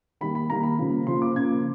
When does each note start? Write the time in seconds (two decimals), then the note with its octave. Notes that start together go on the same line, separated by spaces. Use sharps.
0.21 D#3 G3 A#3 B5
0.35 B5
0.50 D#3 G3 A#3 A#5
0.64 B5
0.79 C#3 F3 A#3
1.07 C#3 F3 A#3 C6
1.22 D6
1.36 C#3 F3 A#3 G#6